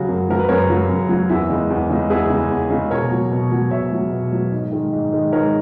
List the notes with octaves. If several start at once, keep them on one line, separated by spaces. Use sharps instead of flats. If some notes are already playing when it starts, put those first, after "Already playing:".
Already playing: C#3 F#3 F#4
F#2
C#3 F#3 A#4
B4
F#2 A#4 C#5
C#3 F#3
F#2
C#3 F#3
E2 E4
C#3 G#3
E2
C#3 G#3
E2 E4 G#4
C#3 G#3
E2
C#3 G#3
B2 A#4 C#5
F#3
B2
F#3
B2 C#5 E5
F#3
B2
F#3
G#2
D#3 G#3
G#2
D#3 G#3
G#2 A#4 C#5